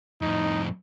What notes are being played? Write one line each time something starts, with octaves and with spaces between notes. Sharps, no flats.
F2 A2 D#4